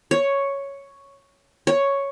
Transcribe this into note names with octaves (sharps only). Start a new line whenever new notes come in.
C#5
C#5